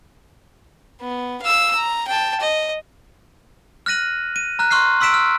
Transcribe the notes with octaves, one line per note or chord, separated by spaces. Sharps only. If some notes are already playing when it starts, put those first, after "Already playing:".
B3
F5 E6
A#5
G5 A5
D#5
F6 F#6 A#6 D#7 F#7
D#7
A#5 F6 F#6
C6 C#6 F6 F#6 C7
C6 E6 B6 D7 E7
F6